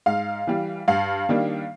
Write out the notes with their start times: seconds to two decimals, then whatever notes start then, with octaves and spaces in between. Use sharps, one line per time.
0.06 G#2 F5
0.47 E3 G3
0.88 G2 F5
1.29 D#3 G3 A#3 D4